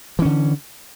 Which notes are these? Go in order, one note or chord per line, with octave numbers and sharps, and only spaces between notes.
D3 E3 C#4